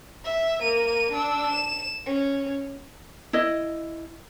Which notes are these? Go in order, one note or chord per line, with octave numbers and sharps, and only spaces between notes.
E5
A#3 D#7
D4 E6
E7
C#4
E4 D#5